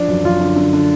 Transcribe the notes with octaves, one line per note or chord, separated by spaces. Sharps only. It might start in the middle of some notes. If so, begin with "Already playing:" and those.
Already playing: F3 D4
F#2
F#2 F4
D3
D3
D3